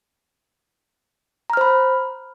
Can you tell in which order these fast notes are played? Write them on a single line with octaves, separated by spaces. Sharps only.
A#5 F6 C5 B5